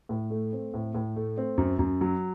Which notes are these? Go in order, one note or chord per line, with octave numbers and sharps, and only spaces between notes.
A2
A3
C4
A2
A2
A3
C4
F#2
F#2
F#3